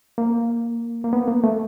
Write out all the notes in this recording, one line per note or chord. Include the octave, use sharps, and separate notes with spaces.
A#3
A#3
B3
A#3
A3